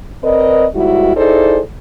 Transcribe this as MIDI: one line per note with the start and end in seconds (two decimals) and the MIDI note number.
0.24 0.65 60
0.24 0.65 70
0.24 0.65 71
0.24 0.65 74
0.24 0.65 75
0.74 1.14 39
0.74 1.14 44
0.74 1.14 55
0.74 1.14 64
0.74 1.14 66
1.15 1.60 63
1.15 1.60 64
1.15 1.60 68
1.15 1.60 69
1.15 1.60 72
1.15 1.60 74